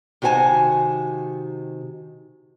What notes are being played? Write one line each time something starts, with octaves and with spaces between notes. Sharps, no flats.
C3 D#3 F#4 B4 G#5 A5